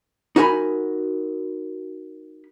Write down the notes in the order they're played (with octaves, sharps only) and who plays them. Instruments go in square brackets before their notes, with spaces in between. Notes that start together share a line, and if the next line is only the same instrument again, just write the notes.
[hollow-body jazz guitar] D#4 F#4 A#4 G#5 B5